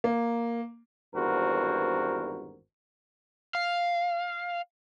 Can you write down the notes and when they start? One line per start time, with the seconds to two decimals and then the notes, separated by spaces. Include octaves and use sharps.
0.04 A#3
1.14 G#1 E2 G2 F#4 A#4 C5
3.55 F5